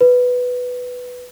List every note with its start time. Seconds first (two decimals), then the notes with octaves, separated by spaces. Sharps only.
0.01 B4